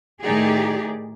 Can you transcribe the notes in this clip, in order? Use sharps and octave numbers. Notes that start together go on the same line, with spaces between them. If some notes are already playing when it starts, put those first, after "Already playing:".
A2 D#3 D#4 G4 G#4 D5